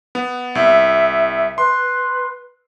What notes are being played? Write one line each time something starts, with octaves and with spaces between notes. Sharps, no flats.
B3
C2 E5
B4 C6